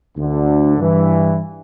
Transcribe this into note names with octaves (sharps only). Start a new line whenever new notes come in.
D2 D3
G2 E3